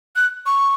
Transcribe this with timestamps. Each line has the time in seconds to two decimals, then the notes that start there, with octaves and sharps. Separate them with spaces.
0.16 F#6
0.46 C#6